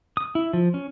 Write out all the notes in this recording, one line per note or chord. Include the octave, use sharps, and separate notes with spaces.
D#6
E4
F3
C#4